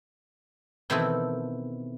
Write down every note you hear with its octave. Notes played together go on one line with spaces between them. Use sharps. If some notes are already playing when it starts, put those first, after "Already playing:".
B2 D#3 E3 C4 E4 A4